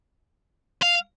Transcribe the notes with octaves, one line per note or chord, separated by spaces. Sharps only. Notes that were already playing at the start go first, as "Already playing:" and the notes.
F5